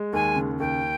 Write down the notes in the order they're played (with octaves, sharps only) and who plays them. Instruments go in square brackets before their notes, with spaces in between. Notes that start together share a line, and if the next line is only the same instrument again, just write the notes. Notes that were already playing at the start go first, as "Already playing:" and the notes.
Already playing: [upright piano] G#3
[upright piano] D#2 [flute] G#5
[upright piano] C#3
[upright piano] D#2 [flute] G5